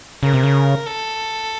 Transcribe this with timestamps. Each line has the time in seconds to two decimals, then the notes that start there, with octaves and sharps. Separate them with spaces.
0.23 C#3 A#4
0.34 C3
0.44 C#3
0.86 A4